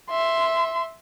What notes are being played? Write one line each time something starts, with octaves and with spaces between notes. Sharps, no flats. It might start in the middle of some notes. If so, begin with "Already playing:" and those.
E5 C6